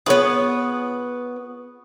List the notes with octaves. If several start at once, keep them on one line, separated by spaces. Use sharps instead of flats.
B3 F4 G#4 B4 C#5 C#6 D#6